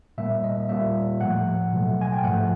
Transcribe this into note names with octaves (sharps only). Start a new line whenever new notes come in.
A#2 G3 A#3 E5
D#5
A#2 G3 A#3 E5
A2 F3 A3 F#5
B2 F#3 A3
G#5
G5
G#2 F3 A3 F#5